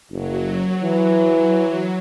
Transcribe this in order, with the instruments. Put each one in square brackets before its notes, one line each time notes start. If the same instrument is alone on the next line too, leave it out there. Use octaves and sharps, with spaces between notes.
[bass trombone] F#1 [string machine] F#3
[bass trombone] E3